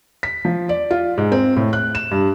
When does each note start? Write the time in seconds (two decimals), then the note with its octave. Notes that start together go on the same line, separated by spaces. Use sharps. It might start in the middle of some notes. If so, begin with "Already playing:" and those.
0.23 B6
0.45 F3
0.69 D5
0.91 F4
1.18 G#2
1.32 C4
1.56 A2
1.73 F#6
1.95 E7
2.11 G2